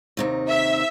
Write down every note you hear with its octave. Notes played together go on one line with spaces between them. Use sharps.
D#2 C3 D#4
E5